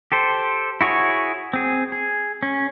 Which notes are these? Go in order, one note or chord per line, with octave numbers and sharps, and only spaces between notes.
G4 A4 C5
E4 F#4 G#4 C#5
C4 G#4
G#4
C#4